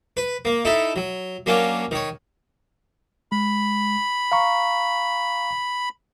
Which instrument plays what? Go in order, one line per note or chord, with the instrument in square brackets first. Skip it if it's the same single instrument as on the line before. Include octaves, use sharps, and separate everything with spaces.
[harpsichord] B4
A#3
D#4 E4 A4
F#3
F#3 A#3 C#4 D4
D#3 C#5
[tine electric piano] G#3 [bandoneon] B5
[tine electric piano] F5 A#5 C#6